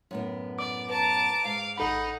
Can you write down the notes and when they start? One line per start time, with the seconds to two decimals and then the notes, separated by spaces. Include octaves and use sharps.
0.11 F#2 A2 B3
0.59 D5 D6
0.90 B4 A5 A#5 D6
1.45 G#2 F5
1.78 A1 D#4 A4 F#5 B5